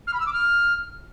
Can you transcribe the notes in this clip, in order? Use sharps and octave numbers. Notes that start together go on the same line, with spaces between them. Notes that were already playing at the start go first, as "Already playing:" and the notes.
F6
B5
E6
D6
F6